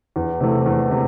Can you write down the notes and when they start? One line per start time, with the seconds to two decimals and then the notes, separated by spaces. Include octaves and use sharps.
0.16 E2
0.40 C3 E3 A3
0.66 E2
0.91 C3